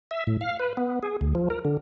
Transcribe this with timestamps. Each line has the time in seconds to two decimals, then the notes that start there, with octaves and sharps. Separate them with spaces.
0.11 E5
0.27 A2
0.41 F5
0.59 B4
0.77 B3
1.03 G#4
1.21 D2
1.35 F3
1.50 A#4
1.65 D3